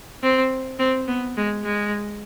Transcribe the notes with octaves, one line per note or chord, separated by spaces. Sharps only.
C4
C4
B3
G#3
G#3